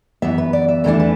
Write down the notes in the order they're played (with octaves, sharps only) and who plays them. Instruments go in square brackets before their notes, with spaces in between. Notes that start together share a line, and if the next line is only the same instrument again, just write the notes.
[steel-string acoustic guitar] F#2 E3 B3 E5
B4
D5
E5
E2 E3 A3 D4 A4
B4